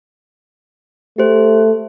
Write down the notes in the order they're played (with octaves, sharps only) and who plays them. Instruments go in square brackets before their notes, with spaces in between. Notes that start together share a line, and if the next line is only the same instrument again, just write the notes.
[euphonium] A3 [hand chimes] G4 C5